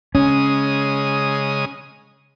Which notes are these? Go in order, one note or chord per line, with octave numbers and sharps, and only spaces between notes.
C#3 G#3 C#4 D#6